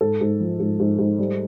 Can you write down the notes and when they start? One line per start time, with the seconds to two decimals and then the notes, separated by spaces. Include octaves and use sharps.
0.01 G#2 A4
0.21 G#2
0.40 F3
0.60 G#2
0.80 G#2
0.99 G#2
1.19 G3